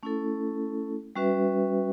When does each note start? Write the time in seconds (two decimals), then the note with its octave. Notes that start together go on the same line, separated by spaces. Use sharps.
0.03 A3 C#4 E4 A4
1.16 G3 C#4 F#4 B4 E5